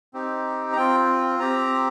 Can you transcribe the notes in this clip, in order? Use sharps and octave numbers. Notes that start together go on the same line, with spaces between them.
C4 D#4 G4
A#5
C4 F4 G5
C4 G4 A#5